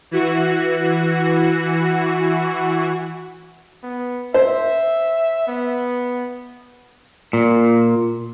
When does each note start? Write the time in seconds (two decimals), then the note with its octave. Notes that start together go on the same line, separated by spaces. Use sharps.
0.11 E3 F#4
3.83 B3
4.34 C5 E5
5.48 B3
7.33 A#2